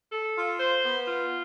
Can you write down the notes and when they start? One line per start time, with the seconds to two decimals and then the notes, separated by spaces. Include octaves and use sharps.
0.12 A4
0.36 F4
0.60 C5
0.84 B3
1.08 F4